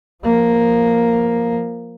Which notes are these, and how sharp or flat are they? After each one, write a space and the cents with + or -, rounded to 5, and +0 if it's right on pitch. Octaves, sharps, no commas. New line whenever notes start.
F3 +0 A#3 +0